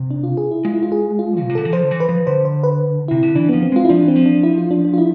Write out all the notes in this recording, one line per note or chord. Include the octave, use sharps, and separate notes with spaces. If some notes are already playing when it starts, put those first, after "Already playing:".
Already playing: C3
D4
F4
G#4
E4
G#3 F4
E4
F4
G#4
F4
B2 F4
C3
D3 A4
E3
F3 C5
D3
E3
B4
F3
D3 C5
C5
B4
C3 E4
D3
E3 D4
F3 B3
C4
G#3 F4
E4
F3 D4
E3
C4
F3
D4
E4
F4
D4
D4
F4
E4